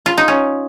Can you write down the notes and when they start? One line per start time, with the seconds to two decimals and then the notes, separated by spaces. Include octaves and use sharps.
0.06 F4
0.18 D#4
0.28 C#4